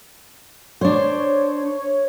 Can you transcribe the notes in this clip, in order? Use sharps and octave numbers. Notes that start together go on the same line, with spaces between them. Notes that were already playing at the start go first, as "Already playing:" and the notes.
D4 C5 C#5